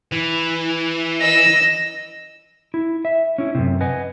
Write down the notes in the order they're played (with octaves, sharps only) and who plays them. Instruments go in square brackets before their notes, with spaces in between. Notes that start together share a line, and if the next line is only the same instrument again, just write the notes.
[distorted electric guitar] E3
[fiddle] D#5 E6 [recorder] A#6
[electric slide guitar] E4
E5
C#4 E4
F#2 C3
B4 D#5 F#5 G#5